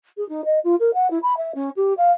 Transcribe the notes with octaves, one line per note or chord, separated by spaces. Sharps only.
G#4
D#4
D#5
F4
A#4
F#5
E4
B5
E5
C#4
G4
F5